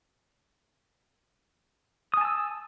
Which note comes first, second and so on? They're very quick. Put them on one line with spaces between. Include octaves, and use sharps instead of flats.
D#6 G#5 A5 E6